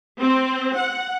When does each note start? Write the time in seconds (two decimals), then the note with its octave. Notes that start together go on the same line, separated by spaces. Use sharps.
0.19 C4
0.78 F#5